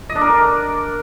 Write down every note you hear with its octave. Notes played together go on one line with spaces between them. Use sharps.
D#5
D4
A#4
D5